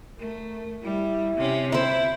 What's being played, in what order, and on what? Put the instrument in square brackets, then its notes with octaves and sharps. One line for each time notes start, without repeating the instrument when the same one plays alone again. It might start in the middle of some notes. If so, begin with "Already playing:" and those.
[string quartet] A3 [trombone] A#4
[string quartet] G3 [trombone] E4
[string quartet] C3 C#4
[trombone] C4 [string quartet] E4 [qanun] C5 E5